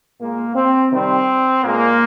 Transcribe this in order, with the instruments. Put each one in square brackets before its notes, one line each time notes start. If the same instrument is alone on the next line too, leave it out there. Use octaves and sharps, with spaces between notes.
[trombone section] A#2 G#3 A#3
C4
C3 D#3 G3 C4
A#2 G#3 A#3